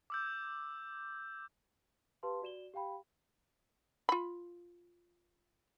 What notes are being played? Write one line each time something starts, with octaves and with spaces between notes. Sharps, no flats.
D6 E6 G6
G4 B4 F5 A5 C6
F#4 D5 E7 G7
G4 F5 G5 B5
F4 B5